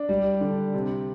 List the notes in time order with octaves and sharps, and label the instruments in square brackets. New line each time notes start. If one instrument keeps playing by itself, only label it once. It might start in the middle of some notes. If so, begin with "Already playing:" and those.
Already playing: [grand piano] D4
G3
D3
C3